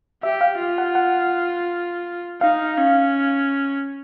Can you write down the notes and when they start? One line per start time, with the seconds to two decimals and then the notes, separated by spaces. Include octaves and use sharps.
0.23 G4 E5
0.41 F5
0.60 F4
0.78 F#5
0.95 F#5
2.41 D#4 F5
2.77 C#4